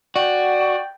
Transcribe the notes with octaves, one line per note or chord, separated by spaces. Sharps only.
F#4 D5 G5